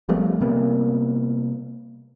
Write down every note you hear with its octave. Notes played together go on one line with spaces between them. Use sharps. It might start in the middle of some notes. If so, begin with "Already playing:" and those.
F3 G3 A3 B3
C3 G3 A#3 B3